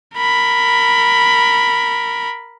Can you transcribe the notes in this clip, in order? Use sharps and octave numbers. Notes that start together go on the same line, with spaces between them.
A#4 B5